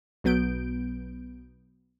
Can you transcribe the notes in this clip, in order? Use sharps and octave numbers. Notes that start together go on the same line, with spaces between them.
B1 F#3 B3 G6 D7